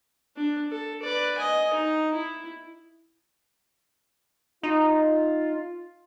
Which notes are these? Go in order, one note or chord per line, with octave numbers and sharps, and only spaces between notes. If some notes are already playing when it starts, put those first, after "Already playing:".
D4
A4
B4 D5
D#5 G#5
D#4
E4
D#4 F4